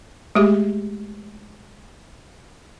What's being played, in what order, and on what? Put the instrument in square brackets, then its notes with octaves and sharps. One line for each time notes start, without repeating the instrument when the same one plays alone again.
[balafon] G#3 A3 G4 G#4